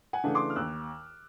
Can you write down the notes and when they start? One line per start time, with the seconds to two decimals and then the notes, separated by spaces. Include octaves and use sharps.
0.13 F#5 G#5
0.24 C#3 E3 A3 D4
0.35 C6 D6
0.50 F6
0.56 D#2 E6 F#6